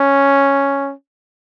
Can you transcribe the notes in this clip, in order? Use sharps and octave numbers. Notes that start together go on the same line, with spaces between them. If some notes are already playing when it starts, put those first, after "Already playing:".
Already playing: C#4